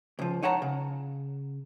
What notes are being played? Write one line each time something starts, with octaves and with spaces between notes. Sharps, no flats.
C#2 F3
D#4 C#5 F#5 A5 A#5
C#3